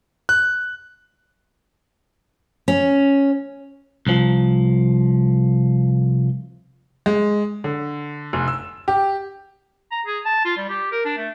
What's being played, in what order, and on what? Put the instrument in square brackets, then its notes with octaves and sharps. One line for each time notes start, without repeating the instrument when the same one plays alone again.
[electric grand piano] F#6
[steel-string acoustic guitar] C#4
[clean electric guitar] C2 F3
[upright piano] G#3
D3
F1
E6
G4
[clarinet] A#5
G#4
A5
F4
G3
G4
A#4
D4
A3